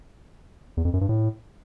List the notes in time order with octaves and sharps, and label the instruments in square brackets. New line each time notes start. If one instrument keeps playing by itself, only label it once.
[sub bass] E2
F2
F#2
G2
A2